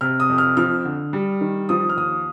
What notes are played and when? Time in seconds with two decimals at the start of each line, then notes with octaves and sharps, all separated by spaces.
0.01 C3 F6
0.20 D#6
0.29 F2
0.38 F6
0.57 F3 F6
0.85 D3
1.13 G3
1.41 D#3
1.69 F3 D#6
1.89 F6
1.97 D#2 D#6